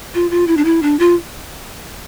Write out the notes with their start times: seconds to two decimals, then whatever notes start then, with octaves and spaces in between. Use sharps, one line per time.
0.14 F4
0.31 F4
0.48 E4
0.57 D4
0.65 E4
0.82 D4
0.99 F4